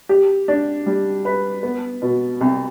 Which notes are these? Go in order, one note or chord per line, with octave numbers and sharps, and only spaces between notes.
G4
D4
G3
B4
B3
B2
C2